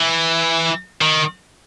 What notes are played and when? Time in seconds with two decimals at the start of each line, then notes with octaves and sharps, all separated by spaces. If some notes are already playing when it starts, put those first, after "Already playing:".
Already playing: E3
1.01 D#3